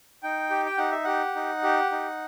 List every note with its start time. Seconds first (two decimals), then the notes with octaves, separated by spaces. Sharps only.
0.23 D#4 G5
0.50 G4
0.66 G5
0.77 D#4 F#5
0.91 E5
1.04 G4 F#5
1.36 D#4
1.63 G4
1.92 D#4